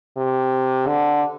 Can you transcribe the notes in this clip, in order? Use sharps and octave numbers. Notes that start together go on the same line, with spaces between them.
C3
D3